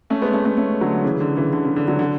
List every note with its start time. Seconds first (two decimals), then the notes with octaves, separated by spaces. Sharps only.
0.10 A3 C#4
0.22 G#3 B3
0.33 A3 C#4
0.45 A3 C#4
0.57 A3 C#4
0.81 D3 F#3
1.04 C#3 E3
1.20 D3
1.36 C#3 E3
1.53 D3
1.65 C#3
1.76 D3
1.88 D3 F#3
1.99 D3